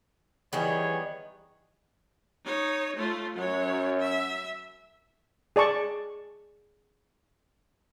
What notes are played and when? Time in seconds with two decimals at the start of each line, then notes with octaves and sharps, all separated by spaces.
0.53 D#3 E3 G3 B3 G#4 C#5
2.45 D#4 C#5
2.96 A3 F4
3.36 F#2 F#3 C#5
4.01 E5
5.56 G#4 D5 A5 C#6